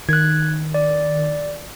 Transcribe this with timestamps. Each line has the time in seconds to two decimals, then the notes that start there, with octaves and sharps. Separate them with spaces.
0.09 D#3 F#6 G#6
0.74 D5